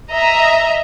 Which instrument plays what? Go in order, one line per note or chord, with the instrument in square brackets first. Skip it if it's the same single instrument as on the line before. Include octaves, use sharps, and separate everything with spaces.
[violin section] D#5 E5 A#5